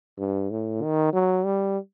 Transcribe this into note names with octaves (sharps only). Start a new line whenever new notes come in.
G2
A2
D#3
F#3
G3